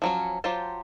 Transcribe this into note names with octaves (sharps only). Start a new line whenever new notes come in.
F3 F#3 C#4
F#3 F4 G4 C5 A5